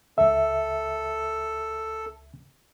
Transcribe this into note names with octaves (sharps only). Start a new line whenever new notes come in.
C#2 A4 E5